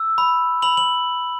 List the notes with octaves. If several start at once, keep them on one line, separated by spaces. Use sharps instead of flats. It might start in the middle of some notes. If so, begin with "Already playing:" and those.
Already playing: E6
B5
B5 F#7
F#7